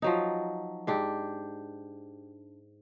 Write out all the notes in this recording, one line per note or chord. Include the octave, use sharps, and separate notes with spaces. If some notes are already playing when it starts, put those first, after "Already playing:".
F3 F#3 D#4
G#2 D4 G4